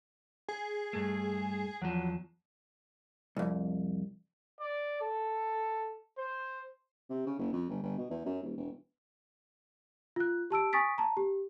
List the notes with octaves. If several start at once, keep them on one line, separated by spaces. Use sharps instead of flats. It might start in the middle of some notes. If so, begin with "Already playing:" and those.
G#4
G2 A3
E2 F3 F#3
C2 F2
D5
A4
C5
C3
C#3
F#1
F2
G1
G1
B2
E2
F#2
D#1
E1
F4 F#6
G4 A5 E6 D7
G#5 C#6 D#6 A6 B6 D7
A5 A#5
G4